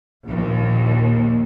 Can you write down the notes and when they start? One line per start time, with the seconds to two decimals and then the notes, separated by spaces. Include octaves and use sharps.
0.24 A#1 D#2